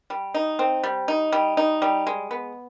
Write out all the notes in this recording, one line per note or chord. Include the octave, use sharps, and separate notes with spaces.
G3
D#4
C4
G3
D#4
G3
D#4
G3
G#3
B3